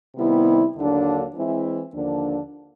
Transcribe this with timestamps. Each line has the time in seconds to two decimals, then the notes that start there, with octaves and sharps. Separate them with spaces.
0.16 C3 D#3 G3 B3 E4
0.75 D#2 D3 F#3 A#3 D4
1.34 E3 G#3 C4 E4
1.93 D#2 D3 F3 A#3 D4